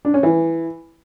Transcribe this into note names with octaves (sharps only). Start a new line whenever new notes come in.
D4
C#4
E3